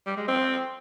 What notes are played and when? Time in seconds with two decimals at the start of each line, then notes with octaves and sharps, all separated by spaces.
0.06 G3
0.17 G#3
0.28 C4